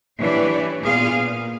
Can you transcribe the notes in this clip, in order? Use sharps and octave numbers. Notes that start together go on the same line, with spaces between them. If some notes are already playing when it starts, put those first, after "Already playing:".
E3 D4 G4 C#5 D5
A#2 B3 F4 G#4 F5
A#2